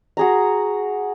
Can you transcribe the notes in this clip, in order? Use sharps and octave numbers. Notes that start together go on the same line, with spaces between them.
F#4 G#4 A#5